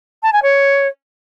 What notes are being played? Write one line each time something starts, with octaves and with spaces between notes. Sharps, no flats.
A5
G#5
C#5